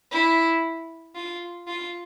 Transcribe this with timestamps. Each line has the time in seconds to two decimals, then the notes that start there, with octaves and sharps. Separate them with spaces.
0.11 E4
1.15 F4
1.67 F4